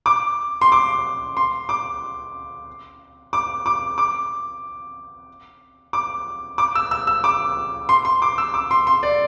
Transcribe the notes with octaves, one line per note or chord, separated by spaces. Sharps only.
D6
C6
D6
C6
D6
D6
D6
D6
D6
D6
E6
E6
E6
D6
C6
C6
D6
E6
D6
C6
C6
D5